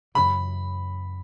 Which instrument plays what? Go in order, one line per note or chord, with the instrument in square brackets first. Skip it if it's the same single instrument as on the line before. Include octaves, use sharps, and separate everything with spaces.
[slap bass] F#2 C#3 E3 [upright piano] B5